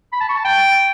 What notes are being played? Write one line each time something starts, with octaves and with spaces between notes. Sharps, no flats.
B5
A5
C#6
A5
G5